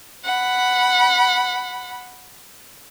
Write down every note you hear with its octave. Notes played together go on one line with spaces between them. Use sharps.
F#5 B5